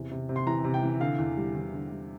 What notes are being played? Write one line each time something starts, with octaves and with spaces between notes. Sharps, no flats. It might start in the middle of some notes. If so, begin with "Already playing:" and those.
Already playing: E2 C3
C3
C3
C6
E3 A#5
C3
G5
E3
D3 F5
E2
G3
E2
D3
G3